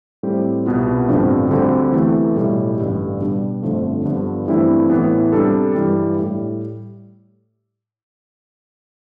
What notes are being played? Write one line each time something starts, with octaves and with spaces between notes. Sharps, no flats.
A2 G3 C4 G4
C2 B2 B3 F4
A1 G2 D3 F3 C4
D2 D3 G3 C4
E2 C3 E3 A3
B1 A2 G3
A1 G2 D3 G3
B2 G3 D4 G4
G1 F2 D3 F3 A3
G2 D3 F3 B3 D4
G2 E3 A3 C4 E4
A2 E3 B3
C3 G3 D4 A4
G2 E3 G3
A2 G3